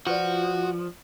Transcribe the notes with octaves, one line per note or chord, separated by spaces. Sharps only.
F3 F4 F#4 B4 D5